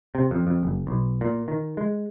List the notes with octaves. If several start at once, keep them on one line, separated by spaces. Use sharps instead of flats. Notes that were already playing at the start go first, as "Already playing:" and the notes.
C3
F2
F2
F#1
B1
A#2
D#3
G#3